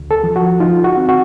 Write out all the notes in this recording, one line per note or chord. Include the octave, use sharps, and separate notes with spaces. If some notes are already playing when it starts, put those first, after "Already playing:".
Already playing: D2
A4
F3
F#4
D#4 F4
F#4
C4
F#4